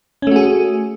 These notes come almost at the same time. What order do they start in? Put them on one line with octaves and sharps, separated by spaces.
C#4 A3 F#4 G#4